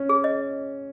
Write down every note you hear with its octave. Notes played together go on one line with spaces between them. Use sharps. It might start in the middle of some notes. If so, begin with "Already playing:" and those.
Already playing: C#4
G#4
D#5